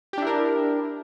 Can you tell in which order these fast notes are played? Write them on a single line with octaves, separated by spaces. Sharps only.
G4 D4 E4 A#4